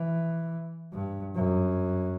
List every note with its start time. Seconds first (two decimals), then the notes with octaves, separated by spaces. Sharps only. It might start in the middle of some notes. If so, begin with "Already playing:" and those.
Already playing: E3
0.93 G2
1.36 F#2